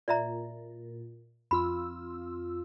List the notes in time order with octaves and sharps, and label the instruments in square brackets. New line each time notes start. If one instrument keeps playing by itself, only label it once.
[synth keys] A#2 [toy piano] D5 E5 A#5
[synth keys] F2 F4 E6 [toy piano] B5